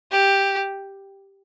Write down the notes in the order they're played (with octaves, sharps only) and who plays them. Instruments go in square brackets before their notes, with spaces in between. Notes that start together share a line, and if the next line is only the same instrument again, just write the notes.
[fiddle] G4